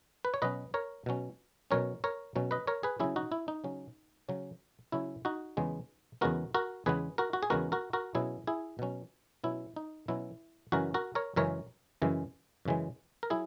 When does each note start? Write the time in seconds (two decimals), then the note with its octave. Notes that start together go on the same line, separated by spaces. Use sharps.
0.25 B4
0.34 C#5
0.42 B2 F#3 C#4 B4 D#5
0.74 A#4 C#5
1.06 B2 F#3 C#4
1.71 B2 F#3 C#4 A#4 C#5
2.04 A#4 C#5
2.36 B2 F#3 C#4
2.51 B4 D#5
2.67 A#4 C#5
2.83 G#4 B4
3.00 C#3 F#3 C#4 E4 G#4
3.16 D#4 F#4
3.32 E4
3.48 D#4
3.64 C#3 F#3 C#4
4.29 C#3 F#3 C#4
4.92 C#3 F#3 C#4 E4
5.25 D#4 F#4
5.57 E2 C#3 G#3 B3
6.21 E2 C#3 G#3 B3 F#4 A#4
6.54 F#4 A#4
6.86 E2 C#3 G#3 B3 G#4 B4
7.18 F#4 A#4
7.33 F#4
7.43 G#4
7.50 E2 C#3 G#3 B3 F#4 A#4
7.72 F#4 A#4
7.93 F#4 A#4
8.15 B2 F#3 C#4 E4 G#4
8.47 E4 G#4
8.79 B2 F#3 C#4
9.44 B2 F#3 C#4 E4
9.76 D#4
10.08 B2 F#3 C#4 E4
10.72 F#2 C#3 E3 G#3 F#4 A#4
10.94 F#4 A#4
11.15 A#4 C#5
11.36 F#2 C#3 E3 G#3 A#4 C#5
12.02 F#2 C#3 E3 G#3
12.65 F#2 C#3 E3 G#3
13.23 A#4
13.30 F#3 E4 G#4